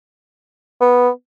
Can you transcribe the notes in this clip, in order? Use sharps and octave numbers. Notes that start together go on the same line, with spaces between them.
B3